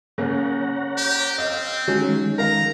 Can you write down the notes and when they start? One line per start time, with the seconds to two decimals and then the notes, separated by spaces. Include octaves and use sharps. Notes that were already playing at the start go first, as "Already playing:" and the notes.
0.18 C#3 A#3 C#5 F#5 A#5
0.97 G4
1.38 C4 D#5 F5
1.88 D#3 F#3 G#3 C#4
2.38 A#4 F5 A#5